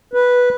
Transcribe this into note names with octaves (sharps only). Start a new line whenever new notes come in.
B4